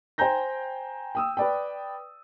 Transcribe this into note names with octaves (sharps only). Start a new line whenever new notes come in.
C5 G5 G#5 A#5 G6 A#6
G5 D#6 E6
B4 D5 G5